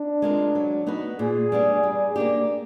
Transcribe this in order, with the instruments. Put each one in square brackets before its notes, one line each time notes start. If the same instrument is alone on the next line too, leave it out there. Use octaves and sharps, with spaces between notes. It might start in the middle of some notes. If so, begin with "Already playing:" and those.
Already playing: [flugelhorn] D4
[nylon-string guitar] G#3 C4 F4 A#4
F#3
B3 D#4 F#4 B4
[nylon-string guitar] A#2 [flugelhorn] G#4
[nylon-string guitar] G3 B3 D4
G3
A#3 D4 G4